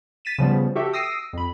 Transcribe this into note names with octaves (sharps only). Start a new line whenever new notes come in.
A6 B6 D#7 E7
C#3 F3 G3 B3
F#4 G4 A4 E5 G5
D#6 E6 A#6 C7 D7 D#7
F2 B5